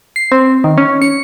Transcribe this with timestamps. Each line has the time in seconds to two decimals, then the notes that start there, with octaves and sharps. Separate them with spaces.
0.16 C7
0.32 C4
0.64 D#3
0.78 C#4
1.02 C#7